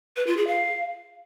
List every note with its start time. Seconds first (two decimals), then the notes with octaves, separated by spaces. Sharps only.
0.17 B4
0.27 F4
0.37 G#4
0.47 F5